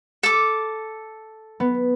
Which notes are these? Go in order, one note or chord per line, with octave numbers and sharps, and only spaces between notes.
A4 D6
B3